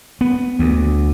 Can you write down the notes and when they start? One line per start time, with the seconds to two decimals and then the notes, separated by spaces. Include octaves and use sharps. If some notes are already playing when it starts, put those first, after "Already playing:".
0.21 B3
0.59 D2